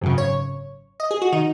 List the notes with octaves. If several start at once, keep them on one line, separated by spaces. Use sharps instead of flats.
G#1 F#2 C#3
C#5
D#5
G#4
F#4
D#3 D#4